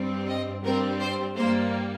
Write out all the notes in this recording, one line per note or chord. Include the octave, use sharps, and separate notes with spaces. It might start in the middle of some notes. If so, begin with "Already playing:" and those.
Already playing: G2 G3 C4
D#5
G2 G3 C4 A#4
C5
G2 G3 A#3 C5